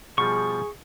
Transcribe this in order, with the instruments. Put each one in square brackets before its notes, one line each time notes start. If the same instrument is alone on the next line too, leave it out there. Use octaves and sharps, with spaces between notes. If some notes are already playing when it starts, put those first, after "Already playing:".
[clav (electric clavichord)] B2 F3 G3 [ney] G#4 [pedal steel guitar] C#6